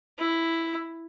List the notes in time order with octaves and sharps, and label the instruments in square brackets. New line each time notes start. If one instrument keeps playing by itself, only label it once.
[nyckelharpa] E4